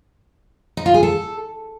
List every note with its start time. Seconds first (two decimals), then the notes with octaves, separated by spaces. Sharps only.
0.77 D#4
0.86 F4
0.94 G#4
1.03 A4